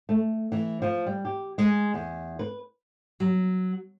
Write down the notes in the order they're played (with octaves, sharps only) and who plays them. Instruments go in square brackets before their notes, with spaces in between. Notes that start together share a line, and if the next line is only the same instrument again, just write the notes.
[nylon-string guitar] A3
E3
F3
G3
G4
G#3
E2
B4
F#3